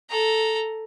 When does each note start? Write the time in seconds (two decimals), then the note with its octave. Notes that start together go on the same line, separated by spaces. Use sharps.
0.10 A4 A#5